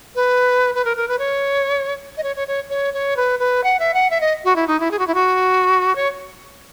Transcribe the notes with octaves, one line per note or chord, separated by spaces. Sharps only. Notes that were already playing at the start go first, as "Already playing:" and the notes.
B4
B4
A#4
A#4
B4
C#5
D#5
C#5
C#5
C#5
C#5
C#5
B4
B4
F#5
E5
F#5
E5
D#5
F#4
E4
D#4
E4
G#4
F#4
E4
F#4
C#5